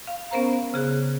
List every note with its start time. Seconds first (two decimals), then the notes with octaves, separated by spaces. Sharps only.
0.07 F5
0.31 B3 C#4 A#4 C5 F5 A#5
0.74 C#3 G#4 F#6